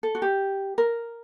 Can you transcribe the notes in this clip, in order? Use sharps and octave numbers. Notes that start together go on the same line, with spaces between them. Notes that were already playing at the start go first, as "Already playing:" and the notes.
A4
F#4
G4
A#4